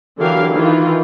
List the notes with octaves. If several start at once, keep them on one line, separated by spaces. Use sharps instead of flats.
D3 E3 F#3 G4 A#4 F5
D#3 E3 F4